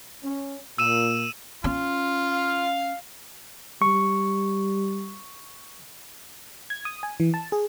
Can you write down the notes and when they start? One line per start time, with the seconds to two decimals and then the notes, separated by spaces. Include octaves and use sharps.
0.24 C#4
0.78 A#2 E6 D#7 E7
1.64 C#4 F4
2.30 F5
3.82 G3 C#6
6.70 G#6
6.85 D#6
7.03 G#5
7.20 E3
7.34 A5
7.52 G#4